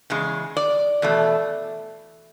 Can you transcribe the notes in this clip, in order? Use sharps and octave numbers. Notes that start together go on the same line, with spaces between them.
E2 C#3 G#3
D5
E2 B2 A3